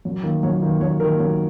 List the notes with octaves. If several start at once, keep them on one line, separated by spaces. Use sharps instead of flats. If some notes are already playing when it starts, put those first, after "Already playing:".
F#2
D#3 A#3
F#2 C#5
D#3 A#3
F#2 C#5
D#3 A#3 A#4
F#2